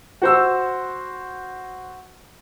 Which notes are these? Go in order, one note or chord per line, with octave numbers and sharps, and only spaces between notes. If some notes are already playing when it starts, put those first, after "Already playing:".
F#4 C5 E6